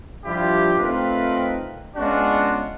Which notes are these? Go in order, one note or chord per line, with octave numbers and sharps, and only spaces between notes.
F3 G3 D4 E4 F4 G4
A3 C4 D#4 F4 A#4 B4
G#3 B3 C#4 D4 F4 F#4